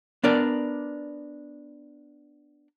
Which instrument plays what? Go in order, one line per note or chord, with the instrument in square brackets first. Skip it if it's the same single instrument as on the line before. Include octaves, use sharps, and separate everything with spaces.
[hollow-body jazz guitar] B3 D4 A#4 D5